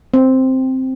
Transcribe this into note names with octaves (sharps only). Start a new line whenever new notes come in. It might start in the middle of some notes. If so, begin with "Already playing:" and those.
C4